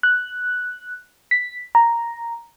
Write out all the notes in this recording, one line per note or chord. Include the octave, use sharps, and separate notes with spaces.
F#6
B6
A#5